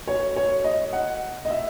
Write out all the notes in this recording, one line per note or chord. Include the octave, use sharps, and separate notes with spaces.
C#5
C#5
D#5
F#5
D#5
E5